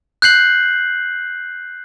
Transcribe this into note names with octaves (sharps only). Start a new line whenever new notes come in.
F#6 G6 C7 F#7